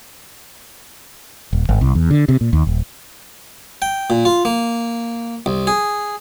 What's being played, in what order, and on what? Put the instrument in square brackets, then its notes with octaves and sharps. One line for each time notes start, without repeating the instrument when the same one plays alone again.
[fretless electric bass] D#1
G#1
C2
E2
D3
C3
A#2
D#2
D#1
[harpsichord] G5
A#2
F4
A#3
C2
G#4